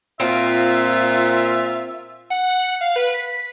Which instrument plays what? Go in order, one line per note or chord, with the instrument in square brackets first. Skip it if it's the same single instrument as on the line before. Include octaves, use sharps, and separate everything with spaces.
[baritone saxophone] A#2 [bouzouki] C4 [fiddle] F4 [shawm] E5
[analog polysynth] F#5
F5
B4
B6